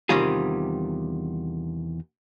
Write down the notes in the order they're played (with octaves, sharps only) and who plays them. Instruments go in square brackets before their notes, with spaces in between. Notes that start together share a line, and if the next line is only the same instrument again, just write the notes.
[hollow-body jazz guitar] E2 C3 D#3 G3 F4 G#4